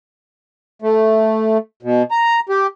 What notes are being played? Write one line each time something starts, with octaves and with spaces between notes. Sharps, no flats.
A3
B2
A#5
G4